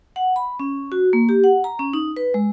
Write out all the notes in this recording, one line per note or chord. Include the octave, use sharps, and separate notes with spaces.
F#5
B5
C#4
F#4
A#3
G4
F#5
A#5
C#4
D#4
B4
G#3